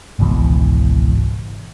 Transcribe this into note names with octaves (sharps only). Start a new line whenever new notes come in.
G#1 C#2 B2 E3